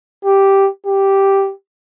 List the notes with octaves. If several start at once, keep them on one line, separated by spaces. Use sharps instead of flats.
G4
G4